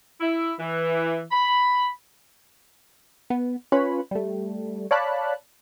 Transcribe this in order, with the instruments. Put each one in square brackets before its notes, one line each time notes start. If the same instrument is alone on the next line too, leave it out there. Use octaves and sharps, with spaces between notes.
[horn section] E4
E3
B5
[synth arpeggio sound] B3
C#4 F4 B4 C#5 B5
G3 A3
C#5 D5 F5 A5 B5 F#6